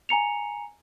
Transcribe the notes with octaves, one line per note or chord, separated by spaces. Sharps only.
G#5 A#5 C#7 F7